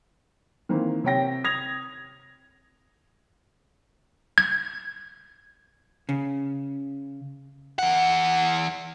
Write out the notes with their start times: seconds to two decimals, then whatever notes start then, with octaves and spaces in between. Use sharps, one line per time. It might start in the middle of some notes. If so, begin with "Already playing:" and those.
0.69 D#3 E3 A#3 C4
1.04 C3 C#5 G5 A#6
1.44 D#6 G#6 A#6 F7
4.38 G#6
6.09 C#3
7.79 E3 F#5